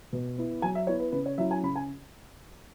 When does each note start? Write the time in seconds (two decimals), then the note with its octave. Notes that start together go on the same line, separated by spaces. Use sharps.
0.13 B2
0.38 B3 E4
0.62 F#3 G#5
0.75 E5
0.87 B3 E4 C#5
1.00 B4
1.12 C#3 B4
1.26 C#5
1.38 F#3 C#4 E4 E5
1.51 G#5
1.63 C#3 B5
1.76 G#5